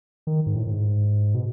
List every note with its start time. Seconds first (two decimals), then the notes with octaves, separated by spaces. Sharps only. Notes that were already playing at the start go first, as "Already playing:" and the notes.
0.27 D#3
0.46 G#2
0.56 A2
0.67 A2
0.71 G#2
1.35 B2